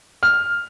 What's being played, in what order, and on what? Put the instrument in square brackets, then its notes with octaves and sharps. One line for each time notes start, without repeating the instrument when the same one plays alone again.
[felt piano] F6